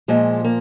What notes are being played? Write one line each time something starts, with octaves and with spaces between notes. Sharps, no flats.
A#2 F3 G#3
A#3